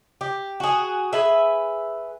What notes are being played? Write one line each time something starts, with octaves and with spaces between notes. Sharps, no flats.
G4
F#4 G#4
G#4 B4 E5